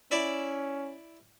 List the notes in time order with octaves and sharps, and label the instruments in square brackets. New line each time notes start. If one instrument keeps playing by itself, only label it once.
[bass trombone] C#4 [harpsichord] E4 D5 E5